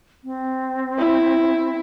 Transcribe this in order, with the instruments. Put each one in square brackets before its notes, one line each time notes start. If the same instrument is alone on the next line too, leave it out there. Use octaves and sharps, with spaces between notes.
[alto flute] C4
[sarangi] E4